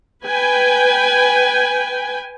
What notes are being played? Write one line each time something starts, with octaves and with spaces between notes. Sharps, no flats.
B4 G5 G#5